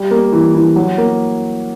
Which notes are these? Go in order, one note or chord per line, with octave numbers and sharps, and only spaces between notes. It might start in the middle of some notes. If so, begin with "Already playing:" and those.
Already playing: G3
A#3
E3
E3
F#3
A#3